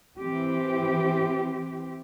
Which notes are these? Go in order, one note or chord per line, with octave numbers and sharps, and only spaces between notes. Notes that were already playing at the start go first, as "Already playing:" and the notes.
E3 C4 G4